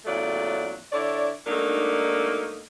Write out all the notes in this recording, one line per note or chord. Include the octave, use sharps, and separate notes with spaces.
E2 A#2 C#3 F#3 A3 D5
D3 D4 E4 C#5 D5
G#2 F#3 A3 A#3 D4 D#4